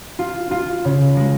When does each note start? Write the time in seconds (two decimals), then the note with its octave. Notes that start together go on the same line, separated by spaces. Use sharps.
0.19 F4
0.51 F4
0.85 C#3
1.17 G#3